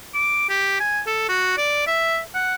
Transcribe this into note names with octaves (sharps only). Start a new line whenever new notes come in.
D6
G4
G#5
A4
F#4
D5
E5
F#5